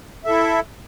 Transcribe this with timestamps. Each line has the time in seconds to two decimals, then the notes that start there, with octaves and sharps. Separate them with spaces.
0.24 E5
0.27 A4
0.29 E4